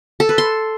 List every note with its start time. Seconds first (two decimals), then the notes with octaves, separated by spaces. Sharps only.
0.20 A4
0.29 B4
0.38 C6